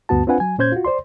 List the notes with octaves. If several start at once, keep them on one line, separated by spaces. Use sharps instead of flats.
D2 G2 B3 F#4 A5
C4 D4 F4 B4 F#5 G#5
F#3 G#5
A#2 C#4 C5 G6 G#6
F4 F#4
C5 D5 C6